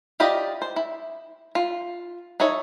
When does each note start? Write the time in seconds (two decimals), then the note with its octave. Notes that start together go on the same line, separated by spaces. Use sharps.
0.20 E4 F4 G4 D5 D#5
0.62 C5
0.76 E4
1.55 F4
2.40 D#4 E4 A4 C#5